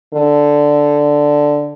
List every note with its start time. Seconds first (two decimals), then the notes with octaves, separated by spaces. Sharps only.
0.14 D3